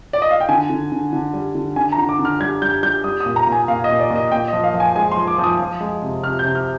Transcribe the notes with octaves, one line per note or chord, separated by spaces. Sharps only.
D5
D#5
F5
G5
D3 G#5
D3
D3
D3
G3
D3
D3 G#5
A#5
D3
D6
D3
F6
G3 G#6
G3 G6
G3 G6
G3 D#6
D#6
A#2
A#5
A#2
G#5
A#2 F5
D#5
A#2
D5
A#2
D#5
A#2 G5
D#5
F3
F5
F3
G#5
G#3 G#5
C6
F3
D6
F3
D#6
F3
G#3
C3
C3 F6
G6
C3
F6